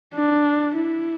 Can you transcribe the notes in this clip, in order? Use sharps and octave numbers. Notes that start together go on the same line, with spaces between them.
D4
E4